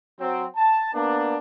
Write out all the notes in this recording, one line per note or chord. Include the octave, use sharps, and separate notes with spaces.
F#3 C4
A5
A#3 B3 D4